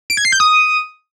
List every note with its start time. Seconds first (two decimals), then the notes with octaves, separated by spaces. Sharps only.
0.10 D7
0.17 G#6
0.25 C7
0.32 G6
0.40 D#6